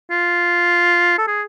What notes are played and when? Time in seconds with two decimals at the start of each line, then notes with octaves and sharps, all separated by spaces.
0.11 F4
1.18 A4
1.27 G#4